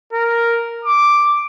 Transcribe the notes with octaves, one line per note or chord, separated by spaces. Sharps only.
A#4
D6